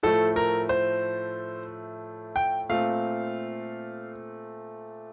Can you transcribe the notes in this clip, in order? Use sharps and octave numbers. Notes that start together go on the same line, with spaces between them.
A2 F3 A3 A4
A#4
C5
G5
A#2 A3 C4 F5